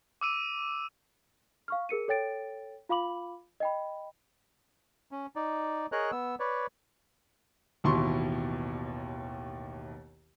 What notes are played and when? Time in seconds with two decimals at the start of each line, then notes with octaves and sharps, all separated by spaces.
0.21 D6 E6 D#7
1.68 F5 C#6 F6
1.89 G#4 A#4 C#7 D#7
2.08 A4 C#5 G5 A6 D7
2.89 F4 F5 B5 D6 F#7
3.60 D#5 G5 B5
5.11 C#4
5.36 D#4 D5
5.92 G#4 A#4 C#5 D#5 A#5 F#6
6.12 B3 E6
6.40 B4 C#5 D5
7.84 A1 D#2 B2 E4 C6 C#6